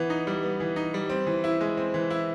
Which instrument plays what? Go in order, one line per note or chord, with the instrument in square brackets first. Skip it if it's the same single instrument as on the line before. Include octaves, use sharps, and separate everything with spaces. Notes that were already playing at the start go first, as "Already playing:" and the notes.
Already playing: [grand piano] E3 B3
D#4
G3
B3
E3
D#4
G3
C4
E3
E4
G#3
C4
E3
E4